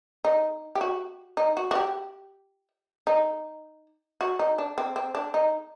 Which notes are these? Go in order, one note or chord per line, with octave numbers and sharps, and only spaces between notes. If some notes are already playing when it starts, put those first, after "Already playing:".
D#4
G4
F#4
D#4
F#4
F#4
G4
D#4
F#4
D#4
D4
C4
C4
D4
D#4